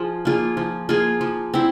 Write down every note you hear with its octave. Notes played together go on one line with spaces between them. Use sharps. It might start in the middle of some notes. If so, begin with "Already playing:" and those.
Already playing: F3 F4 G#4
A#3 F4 G#4
F3
A#3 F4 G#4
F3
C4 E4